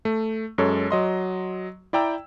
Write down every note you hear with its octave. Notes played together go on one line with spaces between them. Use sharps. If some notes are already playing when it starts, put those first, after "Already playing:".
A3
F#2 G#3 A4 C#5
F#3 D#5 C6
E4 D5 G5 A#5 E6